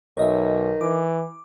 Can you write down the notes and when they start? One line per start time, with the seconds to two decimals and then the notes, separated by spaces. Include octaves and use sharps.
0.17 B1 D#3 C#5 D#5 E5
0.81 E3 D6